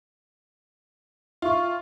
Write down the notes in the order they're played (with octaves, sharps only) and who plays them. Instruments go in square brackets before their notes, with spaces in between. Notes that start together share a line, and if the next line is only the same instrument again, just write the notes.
[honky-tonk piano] F4 [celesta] E5 C#6